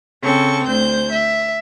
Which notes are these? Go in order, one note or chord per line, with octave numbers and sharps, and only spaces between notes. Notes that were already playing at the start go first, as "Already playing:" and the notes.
C#3 C4 A4 C#6
D2 C5 G6
E5